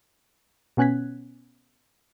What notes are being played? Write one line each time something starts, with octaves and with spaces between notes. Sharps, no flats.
B2 B3 C#4 F#6 G#6 B6